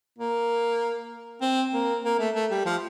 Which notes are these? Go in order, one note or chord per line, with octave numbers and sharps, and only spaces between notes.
A#3
C4
A#3
A#3
A3
A3
G3
F3